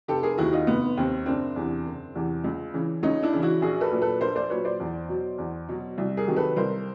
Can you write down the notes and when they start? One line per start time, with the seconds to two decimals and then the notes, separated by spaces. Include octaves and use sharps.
0.08 F1 G4 A4
0.23 G#4 A#4
0.38 D#2 D#3 E4 F#4
0.53 D#4 F4
0.67 F1 B3
0.97 D#2 D#3 C4
1.26 F#1 C4 D4
1.56 E2 C3 E3
1.86 F#1
2.15 E2 C3 E3
2.44 C#2
2.74 C#3 E3
3.03 C#2 C#4 D#4
3.23 D4 E4
3.33 C#3 E3
3.42 E4 F#4
3.62 A#1 F#4 G#4
3.81 A4 B4
3.91 A#2 F#3
4.02 A4 B4
4.21 A#1 A#4 C5
4.35 C5 D5
4.50 A#2 F#3 B4 C#5
4.65 C5 D5
4.80 E2
5.09 B2 F#3
5.38 E2
5.69 B2 F#3
5.98 C2
6.17 G#4 A#4
6.27 C3 D#3 F#3
6.36 A4 B4
6.56 C2 A#4 C5